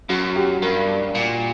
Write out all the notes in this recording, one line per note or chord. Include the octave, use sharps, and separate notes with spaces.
F#2 F#4
G4
G2 A#4
A#2